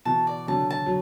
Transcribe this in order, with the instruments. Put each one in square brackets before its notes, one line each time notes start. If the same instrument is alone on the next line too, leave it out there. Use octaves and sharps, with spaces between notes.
[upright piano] B2 E3 [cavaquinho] A5
[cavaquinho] D5
[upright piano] D3 F#3 [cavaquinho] A5
[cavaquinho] A5
[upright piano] F#3